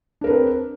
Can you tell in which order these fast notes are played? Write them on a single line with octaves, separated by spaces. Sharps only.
D4 A#4 B4 C4